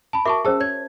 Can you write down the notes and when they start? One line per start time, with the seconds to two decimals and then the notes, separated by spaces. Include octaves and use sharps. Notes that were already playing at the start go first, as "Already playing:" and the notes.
0.13 A5 B5
0.25 F#4 A#4 E5 A5 C#6 D6
0.45 C#4 G#4 C5 A5 E6
0.60 C#5 G#6